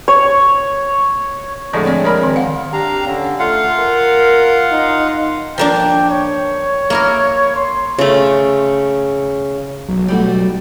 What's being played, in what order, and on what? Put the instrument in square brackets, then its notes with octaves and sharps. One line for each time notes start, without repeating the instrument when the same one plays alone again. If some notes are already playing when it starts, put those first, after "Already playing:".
[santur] C#5
[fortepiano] A2 D3 G#3 [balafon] F3 A4 D5
[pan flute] C4 [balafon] C#5 D5
[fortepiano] G#3 A#4 B5 [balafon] C#5 D5
[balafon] D#3
F5 F#5
[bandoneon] D4 F5 A#5 [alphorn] G4
[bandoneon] D3 [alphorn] C#4
[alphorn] A3 [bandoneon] F4 F5 F#5
[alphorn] A#4
D#4
[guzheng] F3 A#3 D4 [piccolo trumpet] G5
[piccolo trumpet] C#5
[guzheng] A#3 E4 A#4
[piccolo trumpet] C6
[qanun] C#3 A3
[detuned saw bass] B1 [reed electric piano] F#3
[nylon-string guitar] G3 A3 F#4